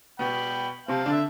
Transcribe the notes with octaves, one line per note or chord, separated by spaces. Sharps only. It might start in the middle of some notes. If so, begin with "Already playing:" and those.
B2 B3 G5 B5
C3 C4 F5 A5
D3 D4
E5